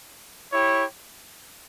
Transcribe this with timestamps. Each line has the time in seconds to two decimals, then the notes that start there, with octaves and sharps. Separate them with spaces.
0.52 E4 G4 C#5